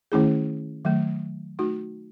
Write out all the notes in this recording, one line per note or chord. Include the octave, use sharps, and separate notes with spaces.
D#3 A3 C#4 E4 G#4
D#3 F#3 A3
A3 D#4 F#4